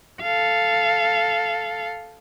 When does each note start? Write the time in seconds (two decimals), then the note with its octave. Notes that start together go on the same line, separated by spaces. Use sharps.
0.22 A4 F5